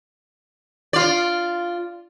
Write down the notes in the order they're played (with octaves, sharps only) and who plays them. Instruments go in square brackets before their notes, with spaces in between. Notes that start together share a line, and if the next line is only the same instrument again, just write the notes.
[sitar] F4 D5